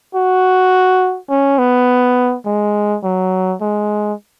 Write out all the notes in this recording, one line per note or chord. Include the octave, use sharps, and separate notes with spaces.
F#4
C#4
B3
G#3
F#3
G#3